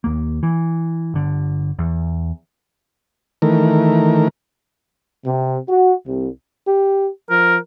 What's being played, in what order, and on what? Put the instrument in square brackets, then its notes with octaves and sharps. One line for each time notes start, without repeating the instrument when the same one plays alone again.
[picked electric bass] D#2 A#3
E3
G1 D3
E2
[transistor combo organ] D#3 E3 A3 A#4
[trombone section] C3
F#4
C2
[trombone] G4
[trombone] F3 [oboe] A#4